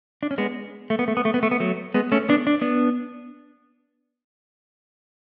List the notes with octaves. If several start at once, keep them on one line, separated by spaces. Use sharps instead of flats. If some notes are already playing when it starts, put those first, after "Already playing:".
D4
C#4
G#3 B3
A3
B3
A3
B3
A3
B3
A3
B3
F#3 A3
G#3 B3
A3 C#4
B3 D4
D4
B3 D4